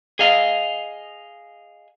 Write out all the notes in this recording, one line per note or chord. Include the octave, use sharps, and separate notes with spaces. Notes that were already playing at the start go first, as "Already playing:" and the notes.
G#4 D#5 F5